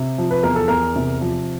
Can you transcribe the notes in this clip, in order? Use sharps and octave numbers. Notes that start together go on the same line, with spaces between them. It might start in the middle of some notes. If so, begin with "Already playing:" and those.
Already playing: C3
F3
B4
E2 A#4
A4
E2 A#4
C3
F3